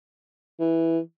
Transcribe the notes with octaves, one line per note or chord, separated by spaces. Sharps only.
E3